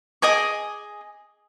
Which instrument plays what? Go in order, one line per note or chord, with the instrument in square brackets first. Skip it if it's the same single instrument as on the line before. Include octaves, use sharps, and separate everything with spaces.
[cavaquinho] G#4 D#5 G#5 D6